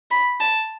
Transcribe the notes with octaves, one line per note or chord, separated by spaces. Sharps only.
B5
A5